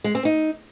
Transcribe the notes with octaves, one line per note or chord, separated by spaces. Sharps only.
G#3
C4
D#4